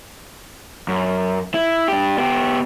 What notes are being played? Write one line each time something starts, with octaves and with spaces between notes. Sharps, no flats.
F#2
E4
D4 G4
B3 G4